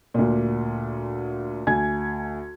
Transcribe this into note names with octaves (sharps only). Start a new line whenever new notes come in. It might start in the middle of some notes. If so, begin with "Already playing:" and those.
D2 A#2
D2 G#5 G#6